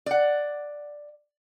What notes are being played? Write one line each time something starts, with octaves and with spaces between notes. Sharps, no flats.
D5 F#5